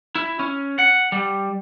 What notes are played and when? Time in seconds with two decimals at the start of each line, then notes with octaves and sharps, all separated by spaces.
0.15 E4
0.39 C#4
0.79 F#5
1.12 G3